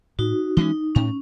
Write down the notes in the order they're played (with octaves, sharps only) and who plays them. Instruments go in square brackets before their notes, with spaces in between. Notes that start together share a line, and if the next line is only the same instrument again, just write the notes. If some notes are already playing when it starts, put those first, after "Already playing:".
[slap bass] A2 [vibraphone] D#4 F#4
[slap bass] E3 G#3 C#4 [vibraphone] D#4
[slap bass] A2 [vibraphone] C#4